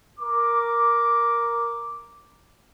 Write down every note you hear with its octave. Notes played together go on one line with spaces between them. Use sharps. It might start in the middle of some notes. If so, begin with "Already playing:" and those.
A#4 D6